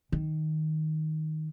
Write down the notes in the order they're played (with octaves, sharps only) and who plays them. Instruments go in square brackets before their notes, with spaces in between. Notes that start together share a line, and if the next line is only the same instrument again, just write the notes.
[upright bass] D#3